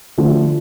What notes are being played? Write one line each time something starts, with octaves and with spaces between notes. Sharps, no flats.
D3 F3 A3